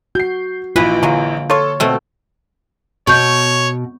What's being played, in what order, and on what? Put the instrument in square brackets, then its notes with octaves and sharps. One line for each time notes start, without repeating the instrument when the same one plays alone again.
[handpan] F#4 [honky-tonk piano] G6 C7
[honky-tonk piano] A#1 E3 [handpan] A#3 F4 [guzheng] B4 D#5
[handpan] D3 F5 [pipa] F#3 G#3
[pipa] F4 C#5 [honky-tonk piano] A4
[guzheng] B2 A3 [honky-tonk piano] C4 A4
[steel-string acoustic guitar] B2 [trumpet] C#5 [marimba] C#6 G6